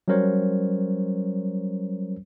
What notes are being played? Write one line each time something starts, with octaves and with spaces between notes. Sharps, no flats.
F#3 G3 C#4 A#4 C5 C#5